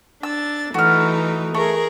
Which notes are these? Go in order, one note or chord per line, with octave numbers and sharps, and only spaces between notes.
D4 E6 A6
E3 A3 D#4 F#4 F6
A3 G#4 A#4